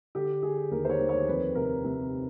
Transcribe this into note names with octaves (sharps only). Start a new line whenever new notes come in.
D3 G4
D3 G#4
D#2 A#4
C5
C#5
D#2
C#5
F2 B4
C3 A#4
C3